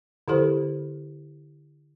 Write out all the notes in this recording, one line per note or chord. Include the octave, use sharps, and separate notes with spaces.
D3 E4 G4 A4 C5